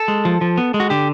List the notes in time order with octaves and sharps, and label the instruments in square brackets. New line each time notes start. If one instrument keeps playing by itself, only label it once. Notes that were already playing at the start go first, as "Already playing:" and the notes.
Already playing: [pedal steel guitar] A4
G#3
F3
F3
B3
G#3
F#4
D3 G4